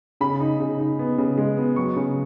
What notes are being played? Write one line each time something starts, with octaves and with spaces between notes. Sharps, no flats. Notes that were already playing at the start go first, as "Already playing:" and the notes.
C#3 B5
D#4
C#3
D#4
B3
C#3
G#3
B3
F#3 C#6
C#3